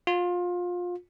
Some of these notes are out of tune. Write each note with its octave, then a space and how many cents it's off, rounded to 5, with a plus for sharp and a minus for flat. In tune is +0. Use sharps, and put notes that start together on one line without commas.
F4 +25